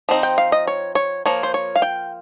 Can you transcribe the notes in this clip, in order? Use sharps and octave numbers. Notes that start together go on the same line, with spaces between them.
F3 C4 D#4
G5
F5
D#5
C#5
C#5
F3 A#3 C#5
C5
C#5
F5
G5